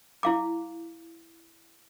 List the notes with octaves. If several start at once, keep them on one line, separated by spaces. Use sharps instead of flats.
E4 F5 D6